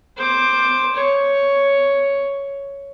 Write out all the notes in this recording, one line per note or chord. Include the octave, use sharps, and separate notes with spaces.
C5 D6
C#5